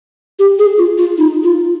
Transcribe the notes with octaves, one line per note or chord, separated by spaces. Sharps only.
G4
G#4
F4
F4
D#4
F4